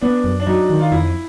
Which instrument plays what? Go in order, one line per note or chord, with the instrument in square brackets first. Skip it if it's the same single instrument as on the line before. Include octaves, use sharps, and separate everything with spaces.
[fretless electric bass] B3 [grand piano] D4
[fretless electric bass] F#2
[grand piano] D4
[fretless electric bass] F#3 [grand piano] D#4
[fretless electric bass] D#3
[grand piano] F4
[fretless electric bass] F2 [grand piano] E4